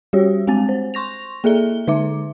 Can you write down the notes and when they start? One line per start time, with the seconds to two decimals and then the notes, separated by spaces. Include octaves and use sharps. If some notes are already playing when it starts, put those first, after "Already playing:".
0.13 G3 F#4 G4 C#5
0.47 G#3 C4 G#5 A6
0.69 C5
0.94 C6 C#6 A#6 F7
1.44 A#3 G#4 A4 E5 G7
1.87 D3 D#4 E5 D6